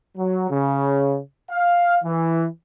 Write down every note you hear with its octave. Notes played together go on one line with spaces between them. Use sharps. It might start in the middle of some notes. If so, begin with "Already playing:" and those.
F#3
C#3
F5
E3